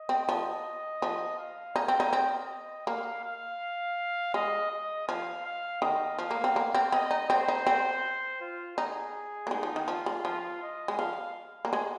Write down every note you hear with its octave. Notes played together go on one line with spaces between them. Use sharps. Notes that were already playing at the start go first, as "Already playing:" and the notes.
Already playing: D#5
C4
F3
F3
F5
D#4
C4
D#4
C4 D#5
A#3 F5
F5
G#3 D#5
D#5
F3 F5
F5
D#3 D#5
F3 F5
A#3
C4
A#3
C4
C4 D#5
D#4
C4 C5
D#4
C4
F4
D#4 G#4
A#3
G#3 D#4
F3
D#3
F3 F4
G#3
F3 F4
D#5
G#3
F3 F5
A#3
G#3